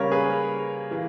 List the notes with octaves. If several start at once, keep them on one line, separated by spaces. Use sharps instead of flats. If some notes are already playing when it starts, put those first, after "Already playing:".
Already playing: C#3 G3 A#3 A#4 C#5
G#4 B4
E3 A#3